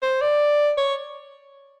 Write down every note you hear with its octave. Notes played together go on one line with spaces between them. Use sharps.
C5
D5
C#5